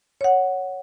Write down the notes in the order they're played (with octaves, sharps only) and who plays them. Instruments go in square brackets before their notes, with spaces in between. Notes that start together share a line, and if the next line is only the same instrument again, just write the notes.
[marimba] C#5 F#5